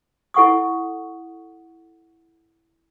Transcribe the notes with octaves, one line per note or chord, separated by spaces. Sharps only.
E4 A4 F#5 C#6 D#6